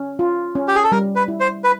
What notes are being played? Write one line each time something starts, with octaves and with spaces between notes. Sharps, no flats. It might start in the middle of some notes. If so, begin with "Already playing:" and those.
Already playing: C#4
F4
C#4
G4
G#4
A4
G3 A#4
B4
E4
C5
B4